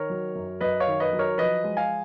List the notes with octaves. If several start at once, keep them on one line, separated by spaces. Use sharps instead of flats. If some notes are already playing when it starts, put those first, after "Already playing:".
Already playing: D#3 A#4 C#5
F#3
F#2
F#2 B4 D#5
C#5 F5
D#3
B4 D#5
F#3
A#4 C#5
F3 B4 D#5
G#3
F5 G#5